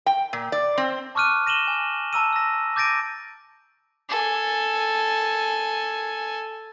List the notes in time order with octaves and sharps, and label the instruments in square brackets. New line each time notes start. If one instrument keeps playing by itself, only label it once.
[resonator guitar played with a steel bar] G5
A#2
D5
C4
[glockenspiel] A5 C#6 D6 F6 F#6 D#7
A#6 D#7 E7 F#7 G7
G#5
A5 A#5 E6 D#7
E6 A#6
D6 G6 A6 A#6 D7 D#7
[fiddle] A4 G#5